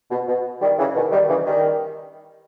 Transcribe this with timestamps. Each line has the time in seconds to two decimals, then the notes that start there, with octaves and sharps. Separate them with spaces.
0.10 B2
0.27 B2
0.61 D#3 G3
0.78 C#3 E3
0.95 B2 D#3
1.12 D#3 G3
1.29 C#3 E3
1.46 D#3 G3